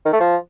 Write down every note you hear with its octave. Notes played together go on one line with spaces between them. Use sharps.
D#3
A3
F3